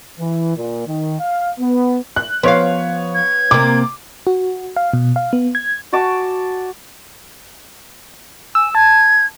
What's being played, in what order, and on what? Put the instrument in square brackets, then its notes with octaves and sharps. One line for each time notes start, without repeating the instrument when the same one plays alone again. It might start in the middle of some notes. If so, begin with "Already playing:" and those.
[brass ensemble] E3
A#2
D#3
F5
B3
[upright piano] F#6
[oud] F3 F5 [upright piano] B3 C#5
[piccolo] G#6
[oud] C3 A#3 [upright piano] D6
[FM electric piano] F#4
F5
B2
F5
B3
G#6
[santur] F#4 G#5 A5 D6
[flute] G#5 [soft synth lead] E6
[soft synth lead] A5 [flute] G#6